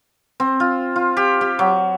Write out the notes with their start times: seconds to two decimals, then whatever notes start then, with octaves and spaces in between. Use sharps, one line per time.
0.40 C4
0.60 F4
0.96 F4
1.17 G4
1.41 G4
1.59 F#3